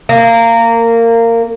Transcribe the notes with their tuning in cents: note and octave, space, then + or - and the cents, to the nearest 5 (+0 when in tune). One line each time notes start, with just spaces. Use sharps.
A#3 -20